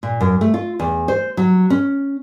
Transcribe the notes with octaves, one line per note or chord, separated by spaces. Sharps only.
A#2
F#2
A3
F4
E2
C5
F#3
C#4